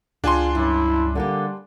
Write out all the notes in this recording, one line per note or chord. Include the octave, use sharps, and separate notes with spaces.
C#2 D4 F4 G#4 G5 G#5 C6
G2 C#4 E4
D3 G3 A#3 G4